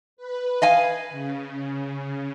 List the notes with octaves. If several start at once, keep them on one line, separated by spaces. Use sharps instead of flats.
B4
D#5 F5 G#5
C#3